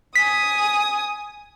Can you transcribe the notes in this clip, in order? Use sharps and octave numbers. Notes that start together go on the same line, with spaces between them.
G#5 D#6 B6